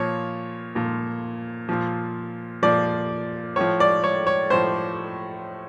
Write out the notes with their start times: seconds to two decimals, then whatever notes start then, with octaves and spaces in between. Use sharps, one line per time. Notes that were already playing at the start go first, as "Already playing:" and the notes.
Already playing: A#2 F3 C#5
0.75 A#2 F3
1.69 A#2 F3
2.63 A#2 F3 D5
3.56 A2 F3 C#5
3.80 D5
4.04 C#5
4.27 C#5
4.50 A2 F3 C5